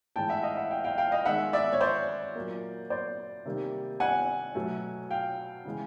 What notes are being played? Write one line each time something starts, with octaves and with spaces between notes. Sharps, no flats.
A2 E3 G#3 G5 A5
E5 F#5
D#5 F5
E5 F#5
F5 G5
F5 G5
F5 G5
D#5 F5
D#3 G#3 E5 F#5
D5 E5
C#5
C5 D5
A#2 F#3 A#3
C5 D5
C3 D#3 G3 A#3
F#5 G#5
B2 F#3 A3
F5 G5
C#3 E3 G#3